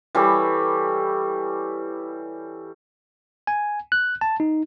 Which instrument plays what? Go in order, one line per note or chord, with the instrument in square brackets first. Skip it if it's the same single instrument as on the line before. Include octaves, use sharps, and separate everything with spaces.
[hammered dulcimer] E3 G3 A4 C#5
[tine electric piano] G#5
F#6
A5
D#4